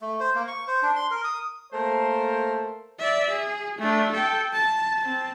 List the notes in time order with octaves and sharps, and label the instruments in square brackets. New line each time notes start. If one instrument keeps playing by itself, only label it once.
[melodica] A3
C5
A#3
C#6
C5
D4
C6
A#4
D#6
[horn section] A3 A#3 A#4 C5
[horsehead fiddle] D5 E5
G#4
A3 D4
A4 G5
A5
C4 A5